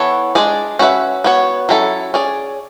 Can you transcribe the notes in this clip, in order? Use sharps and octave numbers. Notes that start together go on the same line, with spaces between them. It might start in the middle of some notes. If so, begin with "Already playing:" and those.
Already playing: E3 B3 E4 A4 C#5
G#3 D4 G#4 D5
C#4 F#4 B4 E5
B3 F#4 C#5
F#3 C#4 E4 A4
C#4 G#4 D5